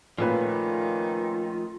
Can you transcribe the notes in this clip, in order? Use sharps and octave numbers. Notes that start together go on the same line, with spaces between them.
A#2 D#3 F3 A3 C#4 F4 B4